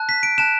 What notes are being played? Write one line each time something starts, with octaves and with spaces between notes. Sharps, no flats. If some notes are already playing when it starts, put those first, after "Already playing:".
Already playing: A5 F#6
B6
D7
A5 F#6 E7